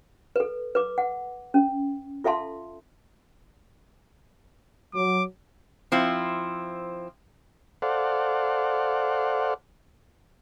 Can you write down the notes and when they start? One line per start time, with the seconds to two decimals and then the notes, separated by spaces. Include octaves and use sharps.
0.36 A4 B4
0.75 B4 D6
0.98 F#5
1.54 C#4
2.24 F4 A4 E5 F5 A5 C6
4.95 F#3 D6
5.92 F3 C4 E4
7.82 A4 C5 D5 F5 F#5